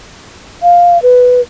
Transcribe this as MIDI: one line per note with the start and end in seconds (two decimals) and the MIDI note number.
0.63 1.01 77
1.02 1.41 71